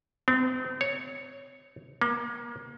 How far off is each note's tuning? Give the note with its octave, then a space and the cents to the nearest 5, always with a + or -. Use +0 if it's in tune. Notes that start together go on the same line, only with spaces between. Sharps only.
C4 -35
C#5 +0
A#3 +30